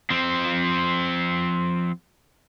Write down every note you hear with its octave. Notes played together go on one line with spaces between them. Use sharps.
F3 C4